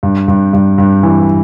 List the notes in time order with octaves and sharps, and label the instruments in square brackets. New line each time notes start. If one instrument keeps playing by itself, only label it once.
[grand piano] G2
G2
G2
G2
E3